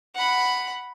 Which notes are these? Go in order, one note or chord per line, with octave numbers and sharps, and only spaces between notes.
F#5 B5